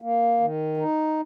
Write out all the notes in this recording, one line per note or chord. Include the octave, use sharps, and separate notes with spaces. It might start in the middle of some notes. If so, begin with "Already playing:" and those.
A#3
D#3
D#4